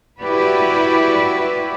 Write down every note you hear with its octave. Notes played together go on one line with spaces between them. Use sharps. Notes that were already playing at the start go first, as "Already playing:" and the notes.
E4 F#4 G4 B4 D5